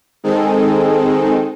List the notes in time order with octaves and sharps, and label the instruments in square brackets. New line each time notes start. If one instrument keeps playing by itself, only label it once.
[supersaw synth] D#3 G#3 C4 D#4 G#4 A4